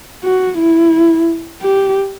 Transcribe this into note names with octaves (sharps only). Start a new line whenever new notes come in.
F#4
E4
G4